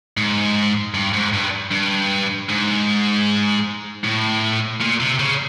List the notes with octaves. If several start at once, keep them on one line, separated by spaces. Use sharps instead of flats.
G#2
G2
G#2
G2
G2
G#2
A2
A#2
C3
C#3